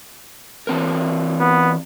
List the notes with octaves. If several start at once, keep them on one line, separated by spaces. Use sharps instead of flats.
E3 C4 A#4
B3